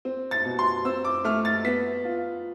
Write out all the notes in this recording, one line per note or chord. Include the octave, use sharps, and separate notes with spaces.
C4
A6
B2
C6
C4 E6
D6
A3 F6
A6
B3 B6
F4